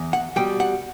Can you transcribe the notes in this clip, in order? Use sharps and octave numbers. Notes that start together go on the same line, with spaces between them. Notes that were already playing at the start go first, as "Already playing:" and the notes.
Already playing: E2
F#5
B2 G3 G5
F#5